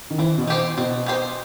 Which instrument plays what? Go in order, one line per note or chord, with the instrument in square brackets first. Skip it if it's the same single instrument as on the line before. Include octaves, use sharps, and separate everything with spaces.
[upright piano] D#3
[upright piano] E3 [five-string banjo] C4
[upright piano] B2
[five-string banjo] D#4 G4 C5
[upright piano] B2 [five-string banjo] C4
[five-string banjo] D#4 G4 C5